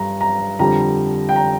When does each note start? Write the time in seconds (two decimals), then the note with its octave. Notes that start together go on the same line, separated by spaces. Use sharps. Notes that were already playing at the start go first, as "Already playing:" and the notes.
Already playing: G2 G3 A#5
0.21 A#5
0.59 F2 D3 G3 A#5
1.29 G5
1.36 A#5